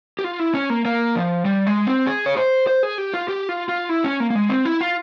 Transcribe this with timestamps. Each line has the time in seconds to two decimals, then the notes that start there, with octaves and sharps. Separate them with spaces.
0.19 G4
0.24 F4
0.39 E4
0.54 C#4
0.70 A#3
0.85 A#3
1.16 F3
1.45 G3
1.67 G#3
1.87 C4
2.07 G#4
2.26 C#5
2.37 C5
2.67 C5
2.83 G#4
2.98 G4
3.14 F4
3.28 G4
3.49 F4
3.69 F4
3.89 E4
4.04 C#4
4.20 A#3
4.30 A#3
4.35 G#3
4.50 C4
4.65 E4
4.81 F4